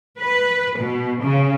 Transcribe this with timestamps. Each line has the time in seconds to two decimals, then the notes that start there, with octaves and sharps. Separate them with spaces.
0.19 B4
0.79 B2
1.22 C#3